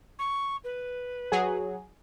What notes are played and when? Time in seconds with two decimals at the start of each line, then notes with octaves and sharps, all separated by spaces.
0.19 C#6
0.64 B4
1.32 F#3 G#4